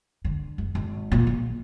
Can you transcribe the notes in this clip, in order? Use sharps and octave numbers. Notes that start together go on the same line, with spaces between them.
D3
F#1
G#1
A#2
A#1